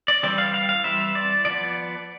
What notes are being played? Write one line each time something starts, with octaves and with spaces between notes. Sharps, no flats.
D5
E3 G3 C4 D5
F5
F5
F5
E3 G3 C4 E5
D5
F3 B3 D5